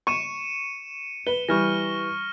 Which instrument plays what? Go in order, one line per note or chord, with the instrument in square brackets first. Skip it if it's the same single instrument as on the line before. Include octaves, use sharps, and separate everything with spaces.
[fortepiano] C#6 [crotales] C#7 D#7 E7
[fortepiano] B4 [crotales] G7
[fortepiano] E3 G3 [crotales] C#6 F6 A#6